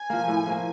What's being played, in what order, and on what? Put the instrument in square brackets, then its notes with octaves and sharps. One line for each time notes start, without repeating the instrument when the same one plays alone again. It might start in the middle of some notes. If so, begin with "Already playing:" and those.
Already playing: [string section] G#5
[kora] F3 A#3
A2
F3 A#3